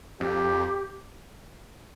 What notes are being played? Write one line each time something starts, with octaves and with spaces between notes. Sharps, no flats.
F2 G4